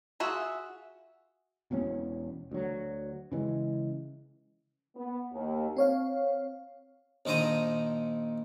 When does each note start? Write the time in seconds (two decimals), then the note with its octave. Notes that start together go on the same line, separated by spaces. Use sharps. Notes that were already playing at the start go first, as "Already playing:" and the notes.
0.20 F4 F#4 G#4 E5 F#5
1.71 E1 E2 B2 C#4
2.52 D2 F#3
3.32 C#3 E3 G#3
4.96 B3
5.32 D#2
5.77 C4 C#5 F5
7.25 A#1 D#3 C5 A#5 D#6